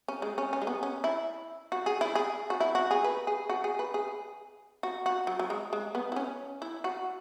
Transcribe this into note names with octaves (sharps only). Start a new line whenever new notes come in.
C#4
G#3
C#4
C#4
G#3
B3
C#4
E4
F#4
G#4
E4
G#4
F#4
E4
F#4
G#4
B4
G#4
F#4
G#4
B4
G#4
F#4
F#4
F#3
F#3
G#3
G#3
B3
E4
C#4
E4
F#4